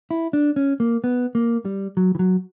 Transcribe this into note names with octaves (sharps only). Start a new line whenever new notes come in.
E4
D4
C#4
A#3
B3
A#3
G3
F#3
E3
F#3